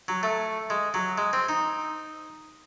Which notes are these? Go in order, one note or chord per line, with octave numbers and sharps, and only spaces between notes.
F#3
A3
G#3
F#3
G#3
C4
D#4